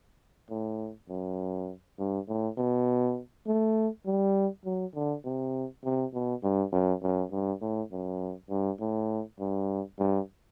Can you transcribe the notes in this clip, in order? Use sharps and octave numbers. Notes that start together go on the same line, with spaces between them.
A2
F#2
G2
A2
B2
A3
G3
F#3
D3
C3
C3
B2
G2
F#2
F#2
G2
A2
F#2
G2
A2
G2
G2